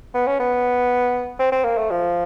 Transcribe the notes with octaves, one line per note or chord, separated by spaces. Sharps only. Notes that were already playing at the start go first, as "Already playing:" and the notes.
B3
C#4
B3
C4
C4
A#3
A3
F3